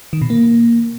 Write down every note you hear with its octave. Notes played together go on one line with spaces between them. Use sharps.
D#3
B2
A#3